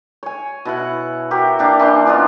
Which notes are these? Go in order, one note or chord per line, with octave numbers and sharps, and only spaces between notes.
C#5 G#5
B2 E4 F#5
E4 F#4 G4 A#4
A#3 D4 G4 F5
E3 C#4 D4 C6
B3 D4 F4 D#5